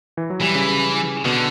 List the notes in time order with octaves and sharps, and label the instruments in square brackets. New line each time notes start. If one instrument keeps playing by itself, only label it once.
[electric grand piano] E3
F#3
[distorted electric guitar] E3 [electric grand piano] G3
[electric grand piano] C#3
C#3
[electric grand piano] B2 [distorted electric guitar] D3